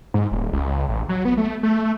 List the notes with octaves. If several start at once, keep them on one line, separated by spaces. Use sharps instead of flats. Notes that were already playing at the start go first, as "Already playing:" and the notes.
G#2
D#1
C#2
A1
F#3
B3
A3
A3